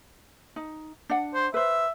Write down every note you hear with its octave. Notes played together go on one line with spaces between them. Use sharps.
D#4
D4 F#5
C5
B4 C5 E5